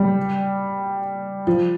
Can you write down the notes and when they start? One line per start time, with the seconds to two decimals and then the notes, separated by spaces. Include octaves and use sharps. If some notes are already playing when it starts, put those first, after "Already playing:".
Already playing: G3
1.47 F3